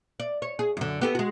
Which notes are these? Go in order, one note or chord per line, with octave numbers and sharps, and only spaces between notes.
D5
C#5
G#4
F#2 D3
B3 G4 A4
G#3 F#4